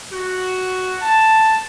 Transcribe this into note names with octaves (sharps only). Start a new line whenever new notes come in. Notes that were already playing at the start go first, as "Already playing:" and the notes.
F#4
A5